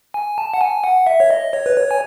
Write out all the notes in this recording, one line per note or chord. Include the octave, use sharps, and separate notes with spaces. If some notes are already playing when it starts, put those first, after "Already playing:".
G#5
A5
F#5
G#5
F#5
E5
C#5
D#5
C#5
B4
C#5
G#5